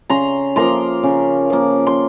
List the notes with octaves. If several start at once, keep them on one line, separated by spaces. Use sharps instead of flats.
C#3 A#5 C6
F3 A#3 A#5 C6
C#3
F3 A#3
C6